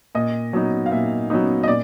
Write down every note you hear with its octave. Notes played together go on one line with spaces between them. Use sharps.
A#2 D#5
F#3 B3 D#4
F5
A#2 E5
F#3 B3 D#4
D#5
A#2 D5